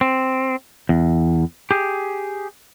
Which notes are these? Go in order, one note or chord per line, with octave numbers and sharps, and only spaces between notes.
C4
E2
G4 G#4